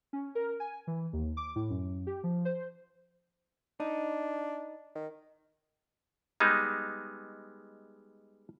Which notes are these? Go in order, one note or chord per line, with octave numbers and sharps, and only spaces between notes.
C#4
A#4
G#5
E3
D#2
D6
A2
F#2
G4
F3
C5
D4 D#4
D#3
G3 G#3 B3 D#4